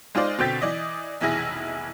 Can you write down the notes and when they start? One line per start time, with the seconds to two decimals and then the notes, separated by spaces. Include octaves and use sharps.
0.15 G#3 D#4 F4 C5 D5
0.39 B2 D3 C4 G6 A6 B6
0.61 E3 D5 D#5 D#6
1.21 F1 B1 E3 E4 G#4 A#6